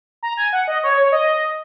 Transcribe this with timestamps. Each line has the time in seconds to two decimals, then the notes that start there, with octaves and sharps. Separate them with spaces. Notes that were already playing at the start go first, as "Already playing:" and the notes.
0.23 A#5
0.37 G#5
0.53 F#5
0.68 D#5
0.83 C#5
0.97 C#5
1.12 D#5